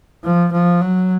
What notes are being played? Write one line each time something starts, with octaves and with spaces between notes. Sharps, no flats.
F3
F3
F#3